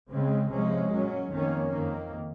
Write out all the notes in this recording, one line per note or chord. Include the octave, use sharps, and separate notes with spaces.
C#3 G#3 C4
C3 F3 G#3 C#4
A#2 F#3 C#4
F2 D#3 A#3 C#4
F2 D#3 A#3